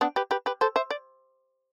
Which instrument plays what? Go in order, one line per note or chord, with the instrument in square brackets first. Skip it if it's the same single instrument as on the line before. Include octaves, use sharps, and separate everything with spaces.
[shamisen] B3 D4
G4 B4
G4 B4
G4 B4
A4 C5
C5 E5
D5